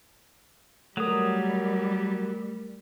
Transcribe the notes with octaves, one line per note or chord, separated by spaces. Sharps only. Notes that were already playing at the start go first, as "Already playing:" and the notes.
F#3 G3 A3 A#4 D#6